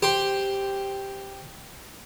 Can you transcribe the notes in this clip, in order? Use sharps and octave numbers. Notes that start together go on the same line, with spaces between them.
G4 C5